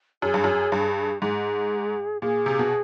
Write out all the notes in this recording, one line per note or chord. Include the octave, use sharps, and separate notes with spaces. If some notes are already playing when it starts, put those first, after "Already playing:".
F#2 G#4
G2
F#2
G2
G#2 G#4
A#2 G#4
C3
B2